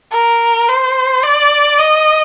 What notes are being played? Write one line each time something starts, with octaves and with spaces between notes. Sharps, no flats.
A#4
C5
D5
D#5